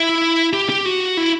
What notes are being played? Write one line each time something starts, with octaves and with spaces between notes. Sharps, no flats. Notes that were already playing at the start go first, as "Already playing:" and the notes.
Already playing: E4
G4
G4
F#4
E4